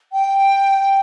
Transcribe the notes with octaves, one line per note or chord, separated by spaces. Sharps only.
G5